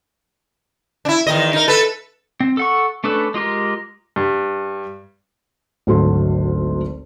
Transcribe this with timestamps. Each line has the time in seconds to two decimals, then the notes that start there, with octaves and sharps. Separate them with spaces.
1.05 D4 E4
1.27 E2 D#3 D#5
1.53 D#4 A#4
1.68 A4 B4
2.40 C4
2.57 A4 F#5 C#6
3.04 A3 C#4 D4 A4 B4
3.34 G#3 F4 G4 A#4
4.16 G2
5.87 G#1 D2 D3 F#3 A3 C6